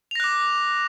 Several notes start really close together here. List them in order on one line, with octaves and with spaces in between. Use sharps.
F7 A#6 F#6 D6